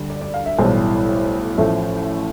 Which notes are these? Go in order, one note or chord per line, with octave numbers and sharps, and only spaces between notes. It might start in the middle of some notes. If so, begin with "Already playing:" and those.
Already playing: D2 D3 G3
D5
D5
F5
E5
B1 A2 E3 G3 C5
A1 A2 F3 A3